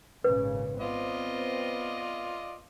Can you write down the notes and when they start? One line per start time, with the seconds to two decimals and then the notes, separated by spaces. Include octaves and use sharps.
0.24 G#1 A#2 C#3 B4
0.80 B3 C4 F4 D5 D#5